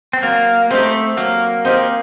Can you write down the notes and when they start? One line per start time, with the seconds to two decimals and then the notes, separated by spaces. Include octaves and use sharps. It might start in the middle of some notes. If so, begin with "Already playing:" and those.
0.13 C4
0.23 F#3 A#3
0.70 A3 C4 D#4 G4
1.17 F#3 A#3
1.65 C4 D#4 G4